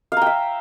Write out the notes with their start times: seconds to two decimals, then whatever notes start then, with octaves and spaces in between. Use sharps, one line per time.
0.12 F5
0.17 A#5
0.22 G5
0.26 E5